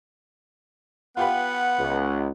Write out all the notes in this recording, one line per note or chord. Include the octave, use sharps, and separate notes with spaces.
B3 F4 G4 B4 F#5
C#2